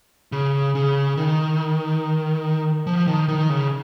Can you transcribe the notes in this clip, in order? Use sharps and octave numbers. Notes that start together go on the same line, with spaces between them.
C#3
C#3
D#3
F3
D#3
D#3
C#3